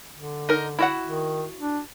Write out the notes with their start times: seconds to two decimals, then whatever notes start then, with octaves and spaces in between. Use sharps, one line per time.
0.15 D3
0.49 D#4 A#4
0.79 E4 F#4 F#5
1.03 D#3
1.58 D4